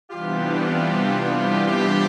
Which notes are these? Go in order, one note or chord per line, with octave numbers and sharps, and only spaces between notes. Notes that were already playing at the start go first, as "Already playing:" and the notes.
C3 E3 G3 B3 D4 F4 G4
F4 G4